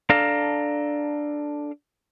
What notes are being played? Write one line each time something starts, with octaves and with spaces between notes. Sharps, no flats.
D4 A4 F5 A5 A#5